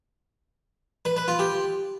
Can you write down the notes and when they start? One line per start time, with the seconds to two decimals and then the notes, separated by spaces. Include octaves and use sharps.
1.05 B4
1.17 B4
1.28 F4
1.39 G4